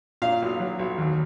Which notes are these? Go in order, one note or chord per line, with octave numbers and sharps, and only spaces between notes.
A#2 F5
B1
F#3
B1
D#2